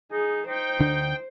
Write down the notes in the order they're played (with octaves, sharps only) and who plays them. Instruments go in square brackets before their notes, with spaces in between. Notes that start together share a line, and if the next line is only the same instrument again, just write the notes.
[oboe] D#4 [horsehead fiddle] G#4
[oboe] D#4 [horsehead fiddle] C5 [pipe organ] G5
[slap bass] D2 D3 D4